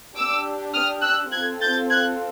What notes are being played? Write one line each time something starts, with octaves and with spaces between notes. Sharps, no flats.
D4 G4 D6 E6
D#6 F6
E6 F#6
C4 F4 A4 F#6 G#6
G6 A6
F#6 G#6